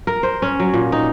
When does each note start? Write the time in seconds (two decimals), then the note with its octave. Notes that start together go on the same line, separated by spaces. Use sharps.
0.07 A#4
0.23 C5
0.42 C#4
0.60 F#3
0.74 A#2
0.92 D#4